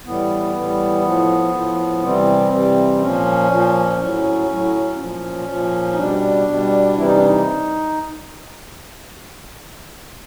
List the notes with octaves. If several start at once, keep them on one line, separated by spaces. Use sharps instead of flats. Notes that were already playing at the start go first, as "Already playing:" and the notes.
A2 E3 G3 B3
A2 E3 G3
A2 F3
A2 F3
C3 E3 G3 C4
C3 E3 G3
A#2 F3 C#4
A#2 F3
A2 F#3 C#4
A2 F#3
A#2 F3 C#4
A#2 F3
D#4
B2 G3 D4
B2 G3
C3 E3 G3 E4
D#4
D4
D#4